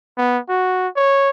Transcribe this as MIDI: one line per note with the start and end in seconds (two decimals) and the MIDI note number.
0.18 0.38 59
0.49 0.88 66
0.96 1.30 73